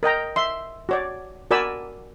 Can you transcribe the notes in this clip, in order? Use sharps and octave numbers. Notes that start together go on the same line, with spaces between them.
A#4 D#5 G5 A#5
E5 C6
F#4 C#5 D5
F#4 A#4 D5 G#5 B5 E6